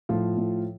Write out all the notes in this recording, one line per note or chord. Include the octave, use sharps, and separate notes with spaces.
A2 F3 F4
A2